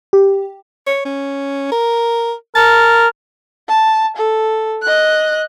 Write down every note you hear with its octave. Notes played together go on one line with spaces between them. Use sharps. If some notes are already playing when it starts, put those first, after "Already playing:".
G4
C#5
C#4
A#4
A#4 A5
A5
A4
D#5 F#6